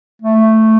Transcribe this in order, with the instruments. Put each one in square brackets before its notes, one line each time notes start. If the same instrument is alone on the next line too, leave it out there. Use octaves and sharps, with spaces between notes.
[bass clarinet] A3